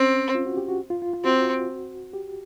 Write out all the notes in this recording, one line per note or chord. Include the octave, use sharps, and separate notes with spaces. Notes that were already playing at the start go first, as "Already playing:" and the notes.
Already playing: C4 C#4
F4
F#4
G4
F#4
F4
F4
F4
C4 F#4
G4